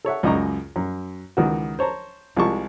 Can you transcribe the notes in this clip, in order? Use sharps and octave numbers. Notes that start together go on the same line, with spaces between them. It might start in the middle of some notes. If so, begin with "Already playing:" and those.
A4 C#5 E5 F#5
C#2 F#2 D#5 A#5 C#6
F#2
C#2 D#3 E3 F#4
C5 C#5 A5 A#5
C2 F3 G#3 A5 C#6